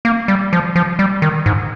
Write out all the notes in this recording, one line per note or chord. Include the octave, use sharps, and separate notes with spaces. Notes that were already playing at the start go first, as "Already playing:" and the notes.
A#3
G3
F3
F3
G3
D#3
G#2